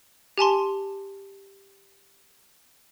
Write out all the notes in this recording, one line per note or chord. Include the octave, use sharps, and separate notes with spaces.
G4 G#5 A5 C6